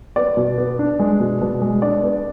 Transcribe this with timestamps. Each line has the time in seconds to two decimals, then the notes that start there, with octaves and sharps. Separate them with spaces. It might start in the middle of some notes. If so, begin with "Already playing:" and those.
0.16 B3 D5
0.37 B2
0.58 B3
0.79 D4
0.99 G#3
1.20 B2
1.41 B2
1.62 G#3
1.82 D4 D5
2.03 B3